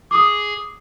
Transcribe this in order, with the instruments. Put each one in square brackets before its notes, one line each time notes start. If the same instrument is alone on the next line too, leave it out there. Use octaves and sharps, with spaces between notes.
[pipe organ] G#4 [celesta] D6 D#6